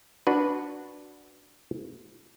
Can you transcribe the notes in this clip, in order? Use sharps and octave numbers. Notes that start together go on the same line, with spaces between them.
D4 F#4 B4